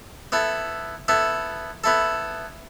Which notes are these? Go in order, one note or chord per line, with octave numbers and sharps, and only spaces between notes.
B3 E4 A4
B3 E4 A4
B3 E4 A4